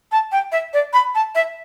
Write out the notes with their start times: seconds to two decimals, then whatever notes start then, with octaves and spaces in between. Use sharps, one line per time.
0.12 A5
0.32 G5
0.52 E5
0.73 D5
0.93 B5
1.15 A5
1.35 E5